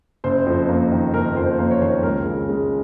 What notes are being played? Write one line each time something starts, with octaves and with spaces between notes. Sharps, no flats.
F#1 C5
F2
A#3
D#3
F#1 A#4
F2 C5
A#3 C5
C#5
D#3 C5
C#2 A#4
C#3
G#3